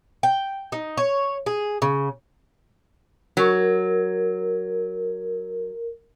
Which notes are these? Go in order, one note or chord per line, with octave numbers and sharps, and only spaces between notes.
G5
D#4
C#5
G#4
C#3
F#3 A#4